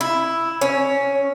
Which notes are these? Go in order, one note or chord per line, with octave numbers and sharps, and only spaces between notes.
E4
C#4